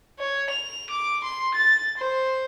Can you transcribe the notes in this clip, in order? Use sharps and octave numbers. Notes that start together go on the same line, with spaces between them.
C#5
F7
D6
C6
A6
C5